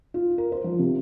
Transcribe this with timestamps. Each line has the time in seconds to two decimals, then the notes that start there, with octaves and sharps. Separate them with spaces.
0.14 F4
0.38 A#4
0.52 C5
0.64 F3
0.79 C3